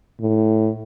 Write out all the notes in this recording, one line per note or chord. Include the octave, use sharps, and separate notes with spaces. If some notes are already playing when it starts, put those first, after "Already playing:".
A2